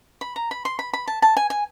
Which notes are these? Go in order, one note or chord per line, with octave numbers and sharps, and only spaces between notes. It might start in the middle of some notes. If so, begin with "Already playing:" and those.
B5
A#5
B5
C6
B5
B5
A5
A5
G#5
G#5